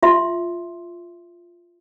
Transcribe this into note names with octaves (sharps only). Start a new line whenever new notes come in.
F4 E5 C6